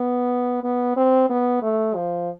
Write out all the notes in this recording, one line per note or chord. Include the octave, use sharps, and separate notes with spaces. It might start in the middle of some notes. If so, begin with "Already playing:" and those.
Already playing: B3
B3
C4
B3
A3
F3